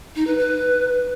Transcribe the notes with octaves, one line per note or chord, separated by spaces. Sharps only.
D#4
B4
B4